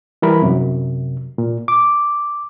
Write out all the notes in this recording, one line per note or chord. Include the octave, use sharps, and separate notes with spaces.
E3 G3 A#4 B5
F#2 C3
A#2
D6